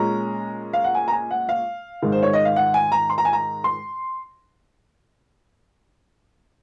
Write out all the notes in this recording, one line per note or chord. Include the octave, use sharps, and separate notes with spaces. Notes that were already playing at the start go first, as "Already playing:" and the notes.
Already playing: A#2 G#3 C#4 A#5
F5
F#5
G#5
A#5
G#5
F#5
F5
G#2 D#3 G#3
C5
C#5
D#5
F5
F#5
G#5
A#5
C6
A#5
G#5
A#5
C6